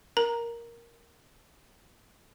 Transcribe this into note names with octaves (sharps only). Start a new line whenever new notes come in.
A#4 A#5